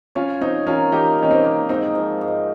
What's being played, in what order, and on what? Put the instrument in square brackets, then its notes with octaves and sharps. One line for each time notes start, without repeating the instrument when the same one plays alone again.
[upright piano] C#4 F4 [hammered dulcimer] C#5
[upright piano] C4 D#4 [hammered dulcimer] C#5
[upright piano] C#4 F4 [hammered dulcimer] A#4
[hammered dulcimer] A#3 [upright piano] D#4 G4
[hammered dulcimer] D#3 [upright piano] C#4
[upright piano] C4 D#4
[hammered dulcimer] A#3
[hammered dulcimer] G#2 [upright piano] C4 D#4
[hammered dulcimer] F3
G#2